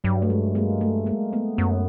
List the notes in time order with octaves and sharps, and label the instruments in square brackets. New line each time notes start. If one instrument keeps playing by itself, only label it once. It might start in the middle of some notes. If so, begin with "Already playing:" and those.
[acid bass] G2 [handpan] F#3
[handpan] A3
G#3
G#3 A#3
A3
G#3 A#3
A3 B3
[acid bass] F#2 [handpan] A3 B3